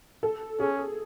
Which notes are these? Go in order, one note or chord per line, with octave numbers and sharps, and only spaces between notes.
A4
C#4 G#4